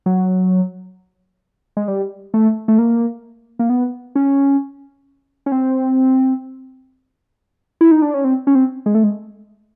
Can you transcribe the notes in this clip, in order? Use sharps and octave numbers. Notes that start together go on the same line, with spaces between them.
F#3
G#3
G3
A3
A3
A#3
A#3
B3
C#4
C#4
C4
E4
D#4
D4
C#4
C4
C#4
C4
G#3
A3
G#3